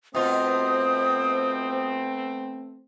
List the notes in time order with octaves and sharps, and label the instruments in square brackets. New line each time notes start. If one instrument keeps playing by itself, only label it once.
[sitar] B2 F4 [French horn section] A3 B3 C4 [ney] C5 [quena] D#6